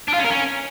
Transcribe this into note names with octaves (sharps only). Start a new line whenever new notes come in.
D4
F4
C#4
A#4
C#4